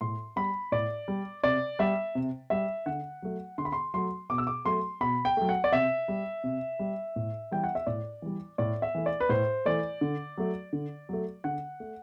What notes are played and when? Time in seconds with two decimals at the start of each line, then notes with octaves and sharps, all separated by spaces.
0.01 A2 C6
0.36 G3 B5
0.72 A2 D5
1.08 G3
1.43 C3 D5
1.79 G3 E5
2.15 C3
2.50 G3 E5
2.86 D3 F#5
3.22 F#3 A3
3.58 D3 C6
3.65 B5
3.72 C6
3.94 F#3 A3 C6
4.30 B2 D6
4.38 E6
4.47 D6
4.65 F#3 A3 C6
5.01 B2 B5
5.25 G5
5.37 F#3 A3
5.49 F#5
5.64 D5
5.72 C3 E5
6.08 G3
6.44 C3
6.79 G3
7.16 A2
7.52 E3 G3 G5
7.64 F#5
7.75 E5
7.87 A2 D5
8.22 E3 G3
8.58 A2 D5
8.82 E5
8.95 E3 A3
9.06 D5
9.20 B4
9.29 A2 C5
9.65 E3 A3 D5
10.01 D3
10.38 F#3 A3
10.73 D3
11.09 F#3 A3
11.44 D3 F#5
11.80 A3